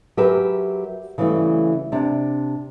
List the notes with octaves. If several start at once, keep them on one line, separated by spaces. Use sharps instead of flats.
F#3 G4 G#4 A#4 B4 E5
C#3 E3 F#3 G3 A3
C3 D4